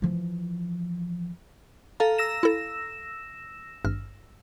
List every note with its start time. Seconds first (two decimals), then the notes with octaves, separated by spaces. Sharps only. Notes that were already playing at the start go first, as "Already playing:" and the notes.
0.02 E3 F3
2.00 A4 F5 A#5
2.18 E6 A#6 E7
2.43 E4 A4
3.85 G#1 G2 F6